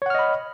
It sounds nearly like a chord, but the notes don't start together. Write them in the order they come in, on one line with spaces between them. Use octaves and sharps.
C#5 F#5 F6 D#5 B5